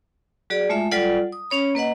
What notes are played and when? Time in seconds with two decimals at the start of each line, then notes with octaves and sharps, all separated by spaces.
0.50 F#3 F#4 G#4 D5
0.69 G#3 A3 F4 E5
0.91 F#3 G3 F4 A4 D5 F#5
1.32 D#6
1.50 C#4 C#5 B5
1.75 A#3 B4 D#5 F#5